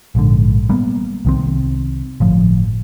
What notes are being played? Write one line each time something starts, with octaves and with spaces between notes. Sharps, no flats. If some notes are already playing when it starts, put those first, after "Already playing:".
A#1 G#2 D3
G3 A#3 B3
C2 D#3 C4
G1 A2 F3